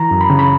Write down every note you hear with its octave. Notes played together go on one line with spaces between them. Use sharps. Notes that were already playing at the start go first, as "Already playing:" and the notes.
Already playing: E3 A#5
F#2
B5
C#3
B5